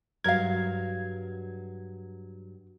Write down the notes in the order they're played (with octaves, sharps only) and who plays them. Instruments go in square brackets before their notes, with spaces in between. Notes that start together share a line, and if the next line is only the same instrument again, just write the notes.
[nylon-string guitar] G2 F#3 [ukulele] A#4 F5 [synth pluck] G#6